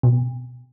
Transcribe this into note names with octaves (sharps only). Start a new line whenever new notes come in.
B2